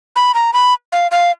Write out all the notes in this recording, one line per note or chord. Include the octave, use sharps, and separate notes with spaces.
B5
A#5
B5
F5
F5